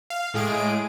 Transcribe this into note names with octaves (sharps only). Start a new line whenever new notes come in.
F5
A2 G#3 G#4 D7